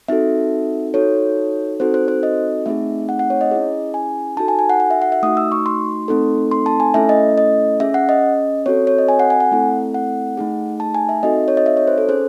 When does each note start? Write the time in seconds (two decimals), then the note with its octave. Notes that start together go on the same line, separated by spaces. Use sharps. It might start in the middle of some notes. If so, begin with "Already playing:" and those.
0.08 C4 D#4 F#4 A4 E5
0.94 D#4 F#4 A4 C#5
1.80 C4 D#4 F#4 A4 C5
1.94 C5
2.08 C5
2.23 D#5
2.66 A3 C4 D#4 G#4 E5
3.09 F#5
3.19 F#5
3.30 C#5
3.41 D#5
3.51 C#4 E4 G#4
3.94 G#5
4.37 D#4 F#4 A4 A5
4.48 G#5
4.59 G#5
4.70 F#5
4.80 F#5
4.91 E5
5.02 F#5
5.12 E5
5.23 A3 D#4 F#4 D#6
5.37 E6
5.52 C#6
5.66 C6
6.08 A3 C4 D#4 A4
6.51 C6
6.66 A5
6.80 G#5
6.94 A3 C#4 E4 A4 E5
7.09 D#5
7.38 D#5
7.80 C#4 G#4 E5
7.94 F#5
8.09 D#5
8.66 C4 F#4 A4 C#5
8.87 C#5
8.98 D#5
9.08 G#5
9.20 F#5
9.30 G#5
9.40 F#5
9.51 A3 C4 E4 A4
9.94 F#5
10.37 A3 D#4 G#4
10.80 A5
10.95 G#5
11.09 E5
11.23 C4 D#4 F#4 A4 D#5
11.48 C#5
11.57 D#5
11.66 E5
11.77 C#5
11.87 C5
11.98 A4
12.09 C#4 G#4 C5